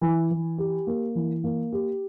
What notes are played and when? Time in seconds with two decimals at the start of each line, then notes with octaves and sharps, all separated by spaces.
0.02 E3
0.31 E3
0.58 G4
0.87 A#3
1.15 E3
1.44 A#3
1.72 G4